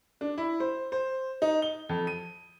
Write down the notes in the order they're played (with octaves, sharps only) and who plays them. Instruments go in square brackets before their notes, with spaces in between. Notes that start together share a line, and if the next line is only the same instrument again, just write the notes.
[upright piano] D4
E4
C5
C5
D#4
G7
F2
D#7